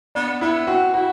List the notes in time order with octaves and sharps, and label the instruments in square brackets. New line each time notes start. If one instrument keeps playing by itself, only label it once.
[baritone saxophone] B3 [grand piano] D4
[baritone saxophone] B3 [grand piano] E4
[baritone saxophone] C4 [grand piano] F#4
[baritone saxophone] E4 [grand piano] F#4